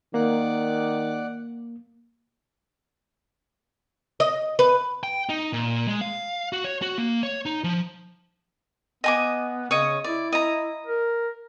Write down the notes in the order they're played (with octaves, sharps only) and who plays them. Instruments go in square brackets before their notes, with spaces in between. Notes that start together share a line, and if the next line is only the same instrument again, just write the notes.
[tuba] D#3 [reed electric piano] A#3 [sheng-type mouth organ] D5 F#5 D6
[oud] D#5
B4
[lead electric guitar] G5
D#4
A#2
G#3
F5
F#4
C#5
F#4
A#3
C#5
D#4
F3
[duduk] B3 [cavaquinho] D#5 G#5 D6
[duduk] C#3 [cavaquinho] C#5 D#5
[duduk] E4 [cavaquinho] D5
[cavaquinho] D#5 A#5
[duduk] A#4